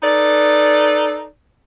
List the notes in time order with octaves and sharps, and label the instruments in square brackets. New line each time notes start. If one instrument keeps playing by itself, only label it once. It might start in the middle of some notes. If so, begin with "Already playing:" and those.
[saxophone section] D#4 A4 B4 D5